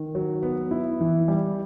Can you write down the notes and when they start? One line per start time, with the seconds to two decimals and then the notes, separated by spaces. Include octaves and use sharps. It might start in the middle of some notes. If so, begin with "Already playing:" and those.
Already playing: D#3
0.15 F#3
0.43 B3
0.71 E4
1.01 E3
1.28 G3